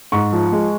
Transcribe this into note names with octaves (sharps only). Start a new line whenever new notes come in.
G#2 C#6
F3
G#3